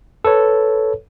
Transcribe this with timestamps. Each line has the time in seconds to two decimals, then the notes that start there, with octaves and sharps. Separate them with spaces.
0.25 A4 B4 C#5